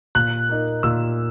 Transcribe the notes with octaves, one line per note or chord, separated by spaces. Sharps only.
A#2 F#6
A#3 D#4
A#2 E6